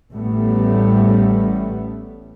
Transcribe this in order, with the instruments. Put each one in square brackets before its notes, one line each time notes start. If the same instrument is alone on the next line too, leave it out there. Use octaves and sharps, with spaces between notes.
[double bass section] A1 A2 G3 A3 B3